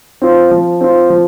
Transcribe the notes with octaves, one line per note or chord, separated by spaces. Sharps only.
C4 F4
F3
C4 F4
F3